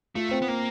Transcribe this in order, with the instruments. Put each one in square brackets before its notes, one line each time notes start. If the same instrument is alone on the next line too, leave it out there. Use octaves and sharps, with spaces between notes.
[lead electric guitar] A3 [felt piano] F4
[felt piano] C4
[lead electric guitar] B3
[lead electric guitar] A#3 [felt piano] C4